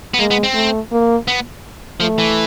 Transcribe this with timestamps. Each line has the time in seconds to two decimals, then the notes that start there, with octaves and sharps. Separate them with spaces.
0.14 B3
0.19 G#3 A#3
0.31 B3
0.43 C4
0.55 A3
0.91 A#3
1.28 B3
2.00 F3 A3
2.19 E3